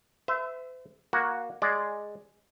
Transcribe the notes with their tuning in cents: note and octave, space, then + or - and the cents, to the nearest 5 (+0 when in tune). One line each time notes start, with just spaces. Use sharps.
C5 -45 E5 +0
A#3 +15 F#4 +0
G#3 +0 D5 +0